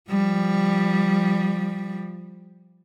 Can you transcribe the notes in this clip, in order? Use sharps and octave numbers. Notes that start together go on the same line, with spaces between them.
F3 G3